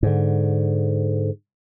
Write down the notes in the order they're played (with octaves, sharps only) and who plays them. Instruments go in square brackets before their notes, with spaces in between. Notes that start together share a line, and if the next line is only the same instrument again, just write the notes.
[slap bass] G#2 D3